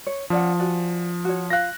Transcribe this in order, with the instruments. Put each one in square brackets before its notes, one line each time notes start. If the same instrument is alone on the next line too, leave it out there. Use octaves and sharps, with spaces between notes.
[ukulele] C#5
[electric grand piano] F3 [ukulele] C#4 D5 F#5
[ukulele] F#4 D5 G#5
F#4 C#5
[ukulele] F4 F5 [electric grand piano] F#6 A#6